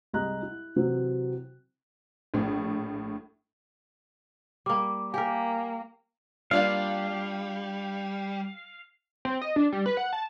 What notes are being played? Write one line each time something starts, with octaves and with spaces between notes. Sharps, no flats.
C2 G#3 D#5 A#5 F#6
E4
C3 E3 F#3 C4
A#1 A2
G3 A#3 D6
A#3 G4 A#4 G#5
G3 A#3 D4 F4 F5
C4
D#5
D4
G3
B4
F#5
A5